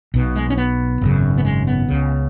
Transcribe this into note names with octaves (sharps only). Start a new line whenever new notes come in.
B1 B2
G#3
C#4
B3
G#1 F#2 C#3
B3
G#3
B3
C#2 C#3